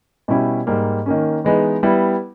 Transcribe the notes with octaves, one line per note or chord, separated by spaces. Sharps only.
B2 G3 C#4 E4 G4
G#2 G3 A#3
D#3 A#3 C#4
E3 G#3 B3 D#4
G3 B3 E4